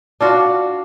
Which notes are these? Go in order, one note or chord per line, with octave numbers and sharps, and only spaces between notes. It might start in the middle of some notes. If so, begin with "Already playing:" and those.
D4 F4 F#4